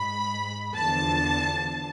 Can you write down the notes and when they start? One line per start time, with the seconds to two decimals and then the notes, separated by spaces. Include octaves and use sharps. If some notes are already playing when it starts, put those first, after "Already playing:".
Already playing: G#2 G#3 B5
0.76 E2 D3 F3 A5